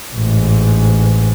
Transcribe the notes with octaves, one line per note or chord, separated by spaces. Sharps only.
A1 G#2